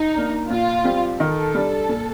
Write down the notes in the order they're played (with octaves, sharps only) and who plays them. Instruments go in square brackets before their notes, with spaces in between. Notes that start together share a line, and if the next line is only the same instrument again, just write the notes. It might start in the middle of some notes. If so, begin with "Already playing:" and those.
Already playing: [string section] D#4
[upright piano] A#3 D4
[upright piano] A#2 [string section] F4
[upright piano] G3 C4 G4
[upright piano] D#3 [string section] A4
[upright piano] G3 D4
A#2